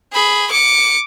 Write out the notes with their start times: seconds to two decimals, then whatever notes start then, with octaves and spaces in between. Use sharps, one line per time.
0.13 G#4 B5
0.51 D6 C#7